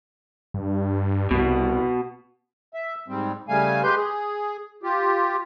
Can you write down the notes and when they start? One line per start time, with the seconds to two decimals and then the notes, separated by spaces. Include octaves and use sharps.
0.54 G2
1.31 C2 B2 B3
2.74 E5
3.08 G#2 G3 C4
3.48 C#3 G3 A3 F5 G#5
3.83 G#3 G4 B4 C6 G6
3.96 G#4
4.83 F4 G4